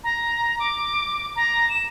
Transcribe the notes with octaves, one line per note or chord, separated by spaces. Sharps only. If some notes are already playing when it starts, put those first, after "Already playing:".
A#5
D6
A#5
E7